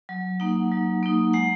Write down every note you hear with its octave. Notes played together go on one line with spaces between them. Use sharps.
F#3
A#3 D#4 F#5
F#3
A#3 D#4
G#3 F#5